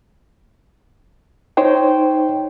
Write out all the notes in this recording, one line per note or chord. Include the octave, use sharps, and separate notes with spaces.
D#4 C5 C#5 G5